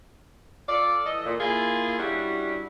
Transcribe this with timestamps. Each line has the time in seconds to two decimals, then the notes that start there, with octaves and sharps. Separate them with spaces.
0.68 F4 A4 D5
1.05 E3 A4 D#5
1.25 A#2
1.40 A#3 E4 F4 G#4
1.98 G3 C#4 D4 E4 F#4